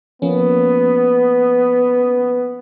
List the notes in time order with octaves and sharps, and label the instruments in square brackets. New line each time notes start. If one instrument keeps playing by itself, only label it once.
[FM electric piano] F3 A#3 C#4 [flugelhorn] B3